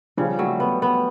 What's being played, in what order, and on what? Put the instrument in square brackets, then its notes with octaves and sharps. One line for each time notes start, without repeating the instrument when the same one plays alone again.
[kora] C#3 [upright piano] F3 G3
[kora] F#3 [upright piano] G3 A3
[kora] B3
B3